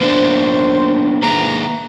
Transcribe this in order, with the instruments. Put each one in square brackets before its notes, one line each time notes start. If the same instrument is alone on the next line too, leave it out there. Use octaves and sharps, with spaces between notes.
[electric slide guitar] A#3 B3 D4 [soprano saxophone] C5
[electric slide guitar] A#3 G#4 B4 [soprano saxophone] A#5